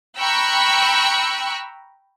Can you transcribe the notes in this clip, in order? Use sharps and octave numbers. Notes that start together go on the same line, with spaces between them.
G5 A#5 B5 C#6 E6 F#6